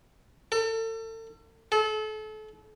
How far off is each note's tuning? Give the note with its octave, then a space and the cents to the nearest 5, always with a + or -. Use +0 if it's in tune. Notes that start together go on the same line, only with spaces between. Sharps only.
A4 +35
A4 -35